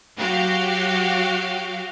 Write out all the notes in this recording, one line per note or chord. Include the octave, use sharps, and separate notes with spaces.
F#3 F#4 G4 F5